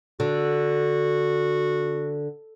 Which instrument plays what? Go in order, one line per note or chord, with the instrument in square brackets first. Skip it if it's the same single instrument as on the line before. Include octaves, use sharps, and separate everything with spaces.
[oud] D3 [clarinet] F#4